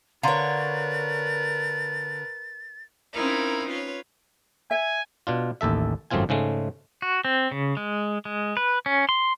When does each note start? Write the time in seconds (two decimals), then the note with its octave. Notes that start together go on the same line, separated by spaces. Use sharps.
0.23 D3 A#4 B4 C#5 F5 A#5 C6 A6
3.13 C4 C#4 D#4 E4 A#4 F5
3.67 F4 B4 C#5
4.71 E5 G#5
5.27 B2 D4 F4
5.61 A1 D#2 A4 E5
6.11 G#1 F#2 A3 C4 F4 G#5
6.29 G#2 C#3 G#3 A3
7.02 F#4
7.25 C4
7.51 C#3
7.77 G#3
8.25 G#3
8.57 B4
8.86 C#4
9.09 C6